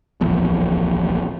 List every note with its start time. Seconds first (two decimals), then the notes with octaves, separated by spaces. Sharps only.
0.21 D1 A#1 E2